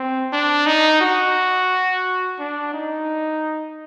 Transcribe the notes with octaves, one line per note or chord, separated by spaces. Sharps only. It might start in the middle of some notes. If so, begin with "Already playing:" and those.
Already playing: C4
D4
D#4
F#4
D4
D#4